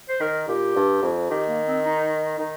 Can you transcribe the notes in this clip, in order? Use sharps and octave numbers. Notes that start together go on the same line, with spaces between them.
C5
D#3 A#4
A#2 G4
G2
F2
D#3 G4
A#3
C4
D#4
D#3 D#4